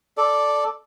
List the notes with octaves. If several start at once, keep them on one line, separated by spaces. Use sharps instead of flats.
A4 D5